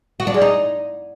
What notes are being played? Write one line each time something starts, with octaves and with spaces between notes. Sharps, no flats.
F#4
D4
G#3
D#4